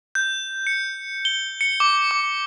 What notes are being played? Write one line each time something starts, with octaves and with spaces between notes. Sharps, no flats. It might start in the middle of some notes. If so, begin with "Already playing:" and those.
G6
C#7
G7
C#7
D6
D6